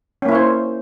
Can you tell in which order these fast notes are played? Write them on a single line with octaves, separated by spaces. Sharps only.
C#4 A#3 E4 C#5 C5